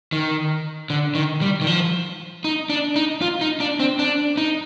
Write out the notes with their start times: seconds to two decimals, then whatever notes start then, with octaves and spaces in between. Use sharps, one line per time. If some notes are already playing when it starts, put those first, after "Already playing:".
0.12 D#3
0.90 D3
1.15 D#3
1.41 G3
1.61 D#3
1.67 F3
2.44 D#4
2.70 D4
2.96 D#4
3.21 F4
3.41 D#4
3.60 D4
3.80 C4
3.99 D4
4.37 D#4